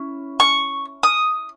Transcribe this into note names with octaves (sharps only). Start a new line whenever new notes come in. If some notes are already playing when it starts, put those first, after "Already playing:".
Already playing: C#4 E4
C#6
D#6